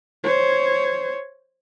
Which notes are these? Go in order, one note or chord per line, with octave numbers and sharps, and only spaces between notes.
C5 C#5